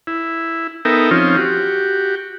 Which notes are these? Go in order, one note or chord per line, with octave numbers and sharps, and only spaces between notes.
E4
B3 D#4 A4 A#4 E5 G5
F3 C4 C#4 D#4 F4
F#4 G4